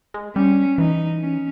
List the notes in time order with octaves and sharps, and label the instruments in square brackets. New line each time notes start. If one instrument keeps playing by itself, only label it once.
[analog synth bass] G#3
[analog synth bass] G3 [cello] C#4
[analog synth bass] E3 [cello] D#4
[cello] C#4